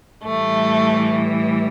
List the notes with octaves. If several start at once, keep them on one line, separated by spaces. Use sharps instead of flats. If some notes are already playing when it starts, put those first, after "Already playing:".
A2 E3 G3 A3